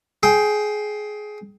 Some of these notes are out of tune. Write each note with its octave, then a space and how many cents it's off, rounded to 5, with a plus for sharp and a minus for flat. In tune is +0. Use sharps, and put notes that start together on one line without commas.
G#4 +20 G5 +0